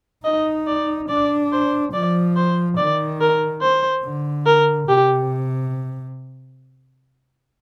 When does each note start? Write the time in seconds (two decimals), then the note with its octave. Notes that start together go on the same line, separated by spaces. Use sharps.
0.25 D#4 D#5
0.67 D5
1.09 D4 D5
1.52 C5
1.93 F3 D5
2.36 C5
2.77 D#3 D5
3.21 A#4
3.61 C5
4.04 D3
4.46 A#4
4.89 C3 G4